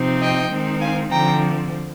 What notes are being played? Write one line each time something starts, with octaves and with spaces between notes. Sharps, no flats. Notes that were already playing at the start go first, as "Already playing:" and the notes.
Already playing: C3 F3 C4 D#4
D#5 G5
D#3 G#3 C4 D#4
F5 G#5
D3 F3 C4 G5 A#5